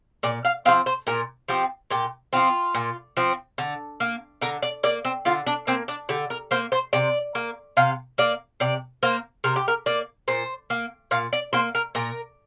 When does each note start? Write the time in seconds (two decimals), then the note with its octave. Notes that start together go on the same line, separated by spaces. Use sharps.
0.23 A#2 D5
0.45 F5
0.65 F3 C4 F5
0.86 C5
1.07 A#2 A#4
1.48 F3 C4 G4
1.90 A#2 G4
2.33 F3 C4 F4
2.75 A#2
3.17 F3 C4
3.58 D3
4.00 A#3
4.41 D3 A#4
4.62 D5
4.83 A#3 D5
5.05 C4
5.25 D3 F4
5.47 D4
5.67 A#3 C4
5.88 D4
6.09 D3 G4
6.30 A#4
6.51 A#3 C5
6.72 C5
6.93 C3 D5
7.35 A#3
7.77 C3 F5
8.18 A#3 D5
8.60 C3 D5
9.03 A#3 C5
9.44 C3 A#4
9.56 G4
9.68 A#4
9.86 A#3 D5
10.28 A#2 C5
10.70 A#3
11.11 A#2 F5
11.33 D5
11.53 A#3 C5
11.75 A#4
11.95 A#2 A#4